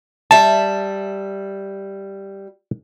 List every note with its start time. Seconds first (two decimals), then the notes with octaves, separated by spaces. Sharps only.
0.31 G3 E5 A5